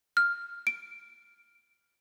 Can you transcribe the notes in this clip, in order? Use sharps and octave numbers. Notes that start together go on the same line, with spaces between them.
F6
D7